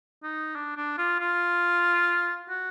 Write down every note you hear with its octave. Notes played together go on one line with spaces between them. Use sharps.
D#4
D4
D4
F4
F4
F#4